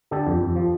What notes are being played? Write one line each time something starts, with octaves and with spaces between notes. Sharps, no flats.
D3 G4 A4
F2
F2
F3